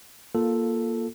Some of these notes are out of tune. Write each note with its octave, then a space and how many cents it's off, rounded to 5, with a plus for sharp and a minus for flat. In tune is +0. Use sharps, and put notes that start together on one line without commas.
A#3 +10 F4 +0 A4 +0